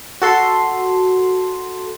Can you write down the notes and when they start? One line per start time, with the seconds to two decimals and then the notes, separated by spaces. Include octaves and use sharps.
0.22 F#4 A4 C6